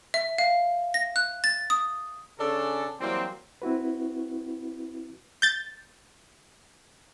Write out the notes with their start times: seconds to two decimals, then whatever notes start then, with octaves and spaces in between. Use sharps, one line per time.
0.14 E5
0.38 F5
0.94 A#6
1.16 F#6
1.44 A6
1.70 D#6
2.39 C#3 C#4 D4 A4
3.00 E3 F#3 G3 A#3 C4
3.62 C4 E4 F#4 B4
5.42 G6 A6